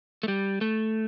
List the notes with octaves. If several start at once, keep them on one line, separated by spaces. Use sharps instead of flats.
A3
G3
A3